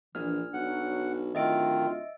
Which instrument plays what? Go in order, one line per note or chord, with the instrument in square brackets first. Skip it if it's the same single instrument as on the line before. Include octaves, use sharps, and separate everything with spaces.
[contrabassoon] A#1 [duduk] E3 [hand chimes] D4 F6
[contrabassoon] B1 [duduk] F#3 [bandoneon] F#5
[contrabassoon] D1 [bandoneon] D#3 [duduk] F4 [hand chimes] D#5 E5 D7